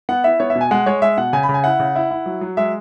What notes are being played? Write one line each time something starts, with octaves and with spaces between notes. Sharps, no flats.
B3 F#5
E4 E5
B3 C#5
E5
B2
G#5
G#3 F#5
G#3 C#5
G#3 E5
B2 F#5
C#3 G#5
B5
C#3
G#5
E4 F#5
C#3
E4
E4
F#3
F#3
G#3 E5